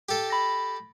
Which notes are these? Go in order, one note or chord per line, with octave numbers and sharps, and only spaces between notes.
G4 A4
B5 A#6